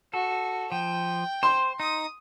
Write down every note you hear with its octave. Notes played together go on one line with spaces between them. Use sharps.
F#4 A4
F3 G5
C5 C6
D#4 D#6